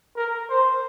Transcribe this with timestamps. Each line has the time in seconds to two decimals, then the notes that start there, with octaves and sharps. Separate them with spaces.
0.16 A#4
0.50 C5